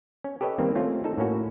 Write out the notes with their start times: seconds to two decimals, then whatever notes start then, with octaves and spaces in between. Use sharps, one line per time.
0.24 C#4
0.41 G4 A4 B4 C#5 D#5
0.58 D#3 G3 A#3 C4
0.75 A3 C4 C#4 F4
1.04 D#4 A4
1.18 A2 A#3 C#4 F#4